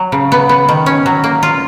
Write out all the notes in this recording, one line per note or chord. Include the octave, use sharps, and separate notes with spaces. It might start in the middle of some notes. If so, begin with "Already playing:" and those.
Already playing: F#3
C#3
B3
B3
D#3
C#4
F#3
A#3
F4